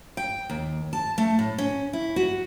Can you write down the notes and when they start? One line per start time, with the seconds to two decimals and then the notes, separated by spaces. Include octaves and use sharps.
0.17 G5
0.50 D#2
0.93 A5
1.18 A3
1.39 A2
1.58 C#4
1.93 E4
2.16 F#4